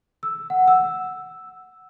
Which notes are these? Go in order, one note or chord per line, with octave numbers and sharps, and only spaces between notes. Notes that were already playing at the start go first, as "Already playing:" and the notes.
E6
F#5
E6